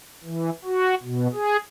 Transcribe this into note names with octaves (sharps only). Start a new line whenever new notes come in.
E3
F#4
B2
G#4